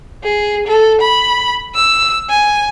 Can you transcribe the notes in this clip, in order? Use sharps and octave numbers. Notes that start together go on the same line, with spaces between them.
G#4
A4
B5
E6
G#5